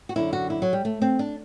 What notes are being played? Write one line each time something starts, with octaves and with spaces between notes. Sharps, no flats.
F#4
F#2 D3 E4
F#4
E4
F#3
G3
A3
C4
D4